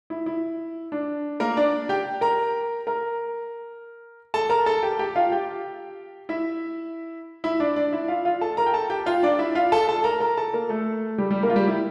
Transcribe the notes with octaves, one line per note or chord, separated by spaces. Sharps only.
E4
E4
D4
A#3 A#4
D4 D5
G4 G5
A#4 A#5
A#4 A#5
A4 A5
A#4 A#5
A4 A5
G4 G5
G4 G5
F4 F5
G4 G5
E4 E5
E4 E5
D4 D5
D4 D5
E4 E5
F4 F5
F4 F5
A4 A5
A#4 A#5
G5
A4 A5
G4 G5
F4 F5
D4 D5
E4 E5
F4 F5
A4 A5
A4 A5
A#4 A#5
A#4 A#5
A4 A5
A#3 A#4
A3 A4
G3 G4
G3 G4
A#3 A#4
F4
G3 G4
E4